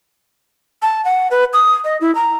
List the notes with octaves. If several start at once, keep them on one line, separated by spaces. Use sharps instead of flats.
A5
F#5
B4
D#6
D#5
E4
A#5